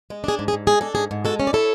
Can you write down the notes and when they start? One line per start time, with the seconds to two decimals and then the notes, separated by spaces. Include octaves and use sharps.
0.10 G#3
0.24 D4 G#4
0.39 G#2
0.48 G#4
0.53 G#2
0.67 G#3 G#4
0.81 D4 A4
0.95 G#2 G#4
1.11 G#2
1.25 G#3 F#4 A4
1.40 C#4
1.47 D5
1.53 E4 A4 C#5